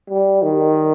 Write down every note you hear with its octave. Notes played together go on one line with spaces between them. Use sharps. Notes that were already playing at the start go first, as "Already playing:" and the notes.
G3
D#3